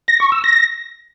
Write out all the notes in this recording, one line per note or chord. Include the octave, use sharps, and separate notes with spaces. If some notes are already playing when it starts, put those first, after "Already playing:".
A#6
C#6
E6
A#6